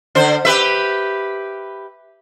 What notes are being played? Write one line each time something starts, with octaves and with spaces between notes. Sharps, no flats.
D3 C5
G4 B4 E5